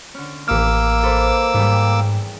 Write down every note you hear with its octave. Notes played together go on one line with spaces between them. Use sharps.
D3 C#4
A1 D#3 E3 A#3 D6 E6 F6
A4 B4 C5
E2 G#2 D#3 G3